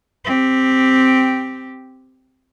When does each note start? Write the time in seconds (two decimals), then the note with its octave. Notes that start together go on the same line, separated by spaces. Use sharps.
0.25 C4 G4